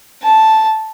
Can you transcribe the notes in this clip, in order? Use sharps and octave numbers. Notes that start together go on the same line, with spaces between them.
A5